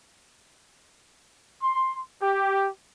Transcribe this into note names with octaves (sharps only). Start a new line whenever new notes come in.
C6
G4